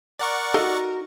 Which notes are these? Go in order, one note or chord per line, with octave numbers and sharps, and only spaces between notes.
A#4 D5 F#5 C#6
D#4 F#4 A4 D#5 F5